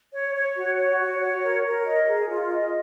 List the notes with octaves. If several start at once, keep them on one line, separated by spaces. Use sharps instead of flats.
C#5
C#5
F#4
C#5
F#4
C#5
A#4
A#4
D#5
G#4
F4
D#5